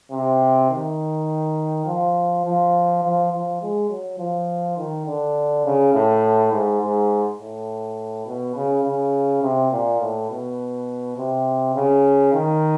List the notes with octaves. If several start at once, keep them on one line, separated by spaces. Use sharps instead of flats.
C3
D#3
F3
F3
F3
F3
G#3
F#3
F3
D#3
D3
C#3
A2
G#2
G#2
A2
B2
C#3
C#3
C3
A#2
A2
B2
C3
C#3
D#3